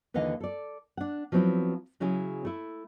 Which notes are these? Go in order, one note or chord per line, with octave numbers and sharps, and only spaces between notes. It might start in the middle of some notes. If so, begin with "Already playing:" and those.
D#2 D3 E3 D#5 F5
A4 D5
D4 F#5
F3 F#3 B3 C4 E4
C#3 F#3 C#4 E4 G#4
A3 E4